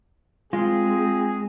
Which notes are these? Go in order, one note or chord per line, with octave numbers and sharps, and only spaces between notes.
G#3 C4 F4 G#4